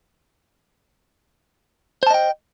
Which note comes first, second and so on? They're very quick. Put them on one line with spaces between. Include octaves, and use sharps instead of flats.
C5 A5 D#5 G5